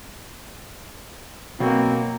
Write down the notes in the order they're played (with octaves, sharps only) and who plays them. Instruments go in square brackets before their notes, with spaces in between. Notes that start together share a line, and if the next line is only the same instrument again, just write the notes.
[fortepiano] B2 F#3 [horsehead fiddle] A#3 [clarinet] C4